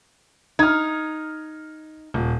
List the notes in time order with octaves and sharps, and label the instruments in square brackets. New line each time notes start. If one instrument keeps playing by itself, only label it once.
[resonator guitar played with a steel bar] D#4 [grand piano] F6 G#6
[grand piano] D#1